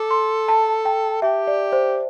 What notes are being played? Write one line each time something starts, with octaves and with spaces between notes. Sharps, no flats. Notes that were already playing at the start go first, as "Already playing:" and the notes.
Already playing: A4 D6
C6
A5
G5
G4 E5
D5
C5